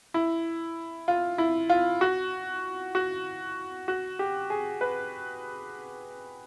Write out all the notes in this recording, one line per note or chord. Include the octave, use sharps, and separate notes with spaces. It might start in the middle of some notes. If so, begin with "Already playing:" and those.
E4
F4
E4
F4
F#4
F#4
F#4
G4
G#4
B4